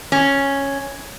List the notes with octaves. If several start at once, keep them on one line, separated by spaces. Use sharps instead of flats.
C#4